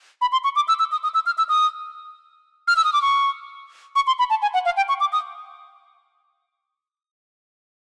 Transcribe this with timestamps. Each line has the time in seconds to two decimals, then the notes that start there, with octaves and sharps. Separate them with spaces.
0.21 B5
0.32 C6
0.44 C#6
0.56 D6
0.68 E6
0.79 E6
0.92 D#6
1.03 D#6
1.14 E6
1.26 F6
1.38 E6
1.49 D#6
2.68 F6
2.76 E6
2.84 D#6
2.93 D6
3.02 C#6
3.95 C#6
4.07 C6
4.19 B5
4.30 A5
4.42 G#5
4.54 F#5
4.65 F5
4.77 G5
4.88 C#6
5.00 D6
5.12 D#6